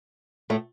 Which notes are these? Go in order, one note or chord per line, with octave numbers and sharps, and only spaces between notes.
A2 A3